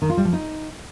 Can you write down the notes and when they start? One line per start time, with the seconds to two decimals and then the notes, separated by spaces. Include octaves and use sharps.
0.02 D#3
0.10 F4
0.17 G3
0.25 F3
0.33 D#4